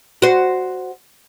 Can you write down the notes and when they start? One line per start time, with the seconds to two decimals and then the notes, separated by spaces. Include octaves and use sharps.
0.22 F#4 C5